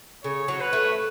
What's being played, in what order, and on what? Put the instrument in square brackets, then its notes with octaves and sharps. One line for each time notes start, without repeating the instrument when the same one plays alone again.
[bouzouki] C#3 [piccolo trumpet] C#5
[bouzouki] F#3
[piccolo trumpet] B4
[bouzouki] A3